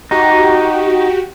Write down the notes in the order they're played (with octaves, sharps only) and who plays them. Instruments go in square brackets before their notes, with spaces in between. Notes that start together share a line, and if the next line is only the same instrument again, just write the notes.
[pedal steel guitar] D#4 [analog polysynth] F#4 G4